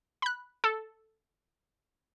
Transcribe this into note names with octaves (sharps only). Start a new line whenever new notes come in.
B5 F#6
A4